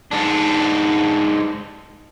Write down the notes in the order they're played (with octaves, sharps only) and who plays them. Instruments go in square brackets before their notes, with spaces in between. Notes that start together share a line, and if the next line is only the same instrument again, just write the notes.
[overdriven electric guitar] G#2 D4